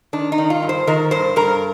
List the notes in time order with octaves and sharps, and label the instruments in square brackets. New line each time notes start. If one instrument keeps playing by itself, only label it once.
[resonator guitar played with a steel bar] D#3 D4
D#4
D#3
F4
G2
C5
D#3 A#4
G2 C5
G2 A#4